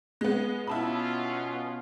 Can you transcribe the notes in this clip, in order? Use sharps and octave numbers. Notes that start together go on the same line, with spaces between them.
G#3 B3
B2 B3 C#4 E4 F4 A5 B5